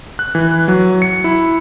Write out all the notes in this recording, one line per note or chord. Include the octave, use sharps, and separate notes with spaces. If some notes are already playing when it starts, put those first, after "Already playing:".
F#6
E3
F#3
C#7
E4